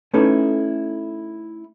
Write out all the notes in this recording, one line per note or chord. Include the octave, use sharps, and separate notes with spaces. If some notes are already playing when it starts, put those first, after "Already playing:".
A3 C#4 D#4 E4 A4 B4